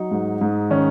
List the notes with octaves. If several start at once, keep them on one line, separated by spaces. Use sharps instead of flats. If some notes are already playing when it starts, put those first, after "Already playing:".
Already playing: F#3 D#4
G#2
G#2
D#3 C#4